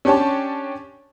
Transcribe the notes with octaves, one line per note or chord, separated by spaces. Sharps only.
C#4 D4 G4 C#5 A5